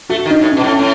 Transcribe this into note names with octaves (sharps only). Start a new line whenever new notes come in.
A3 F#4
D#3
D#4
A2
C#4
B2
A2
C#4
A2